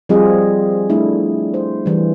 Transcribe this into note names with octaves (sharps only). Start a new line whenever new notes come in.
F3 G3 C4 F4 G#4 D#5
A3 D4 E4
C5
E3 G3